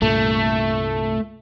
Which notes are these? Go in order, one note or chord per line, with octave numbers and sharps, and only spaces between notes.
C2 G2 A#2 A3